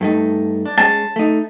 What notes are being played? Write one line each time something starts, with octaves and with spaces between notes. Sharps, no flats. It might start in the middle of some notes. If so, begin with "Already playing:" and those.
G2 A3 D#4
D4
G#3 C#4 A5
A3 D#4